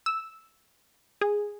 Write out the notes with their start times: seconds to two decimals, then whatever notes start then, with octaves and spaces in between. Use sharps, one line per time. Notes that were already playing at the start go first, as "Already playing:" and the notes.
0.06 E6
1.21 G#4